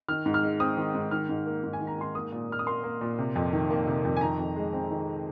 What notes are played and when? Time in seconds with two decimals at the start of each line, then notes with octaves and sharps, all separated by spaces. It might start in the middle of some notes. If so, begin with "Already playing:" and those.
0.08 D#3 F6
0.26 G#2
0.34 F6
0.43 G#3
0.60 C4 D#6
0.77 D#3
0.95 G#2
1.11 D#3 F6
1.29 G#2
1.46 A#3
1.63 G#2
1.73 G#5
1.81 D#3
1.87 A#5
1.98 G#2 C6
2.15 A#3 D#6
2.32 A#2
2.49 A#2 F6
2.59 D#6
2.67 A#3 C6
2.84 A#3
3.01 A#2
3.18 C3
3.36 F2
3.53 D#3
3.70 A#3
3.87 C3
4.05 F2
4.16 G#5
4.21 D#3 A#5
4.39 F2
4.56 G#3
4.73 C4
4.90 D#3